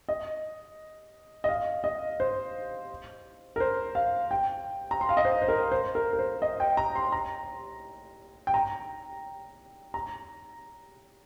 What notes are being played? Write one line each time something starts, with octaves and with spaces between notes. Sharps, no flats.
D#5
D#5
F5
D#5
C5
A#4
C5
F5
G5
A#5
C6
F5
D#5
C5
C5
A#4
C5
A#4
A#4
C5
D#5
G5
A#5
C6
A#5
G5
A#5
A#5